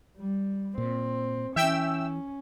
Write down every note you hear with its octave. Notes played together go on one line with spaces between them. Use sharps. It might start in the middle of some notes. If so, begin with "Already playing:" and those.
G3
A#2 C4
E3 C#4 E5 G5 E6